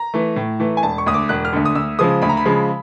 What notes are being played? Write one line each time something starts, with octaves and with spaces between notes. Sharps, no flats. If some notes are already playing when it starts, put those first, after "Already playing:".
Already playing: A#5
E3 A3
A2
E3 A3
G#5
E1 A5
C#6
D2 D3 D#6
D6
E1 F#6
F6
D2 D3
D#6
D2 E6
C#3 F3 G#3 D#6
D2 B5
A#5
B5
C#3 F3 G#3